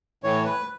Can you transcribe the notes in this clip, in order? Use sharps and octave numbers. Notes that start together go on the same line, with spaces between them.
A2 E3 C#5
B4